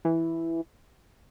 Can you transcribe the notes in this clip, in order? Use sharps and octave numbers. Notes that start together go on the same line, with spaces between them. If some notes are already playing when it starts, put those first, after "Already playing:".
E3